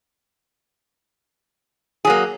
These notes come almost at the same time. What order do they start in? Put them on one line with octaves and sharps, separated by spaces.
G#4 F#3 A#3